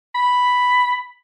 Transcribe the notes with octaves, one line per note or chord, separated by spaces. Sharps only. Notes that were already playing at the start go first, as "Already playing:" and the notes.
B5